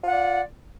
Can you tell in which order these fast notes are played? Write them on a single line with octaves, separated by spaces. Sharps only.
F4 F#5 D5